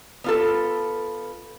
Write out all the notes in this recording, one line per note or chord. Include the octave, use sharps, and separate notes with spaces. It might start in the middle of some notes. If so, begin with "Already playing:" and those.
B3 F4 A4